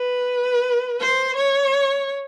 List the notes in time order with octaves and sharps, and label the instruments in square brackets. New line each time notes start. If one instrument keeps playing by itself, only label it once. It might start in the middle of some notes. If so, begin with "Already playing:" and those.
Already playing: [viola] B4
C5
C#5